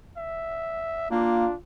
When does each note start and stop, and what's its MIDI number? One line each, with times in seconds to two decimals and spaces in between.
0.17 1.11 76
1.11 1.46 58
1.11 1.54 62
1.11 1.55 65